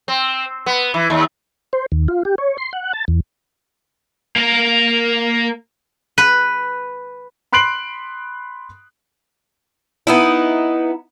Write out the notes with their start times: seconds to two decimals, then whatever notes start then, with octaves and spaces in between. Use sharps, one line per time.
0.08 C4
0.66 B3
0.94 E3
1.10 D#2
1.73 C5
1.92 D#2
2.08 F4
2.25 G4
2.38 C#5
2.58 C6
2.73 F#5
2.93 A5
3.08 E2
4.36 A#3 A#4
6.18 B4
7.53 B5 C6 F#6 C7 D7 F#7
10.07 B3 D#4 E4